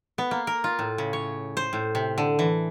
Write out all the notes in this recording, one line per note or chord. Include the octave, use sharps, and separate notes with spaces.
B3
A#3
A#4
F4
A2
C#3
C#5
C5
A2
C3
D3
E3